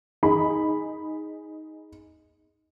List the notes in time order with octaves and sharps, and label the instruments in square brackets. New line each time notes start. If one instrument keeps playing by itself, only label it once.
[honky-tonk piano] D#4 G#4 B5